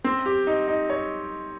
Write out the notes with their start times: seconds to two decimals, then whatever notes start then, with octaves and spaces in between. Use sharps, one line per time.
0.04 C4
0.26 G4
0.47 D#4
0.68 D#4
0.90 C#5